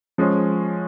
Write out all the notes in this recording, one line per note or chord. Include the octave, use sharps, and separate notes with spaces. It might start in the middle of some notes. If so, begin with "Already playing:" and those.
F3 G#3 C#4